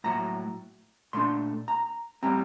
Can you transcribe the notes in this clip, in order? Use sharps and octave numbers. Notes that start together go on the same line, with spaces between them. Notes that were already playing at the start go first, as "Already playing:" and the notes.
A2 F#3 A#3 A#5
A#2 A3 D4 C6
A#5
A2 G3 C4 A#5